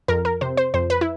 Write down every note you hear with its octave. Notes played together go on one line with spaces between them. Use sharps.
F2 A#4
A#4
C3 C5
C5
F2 C5
B4
E4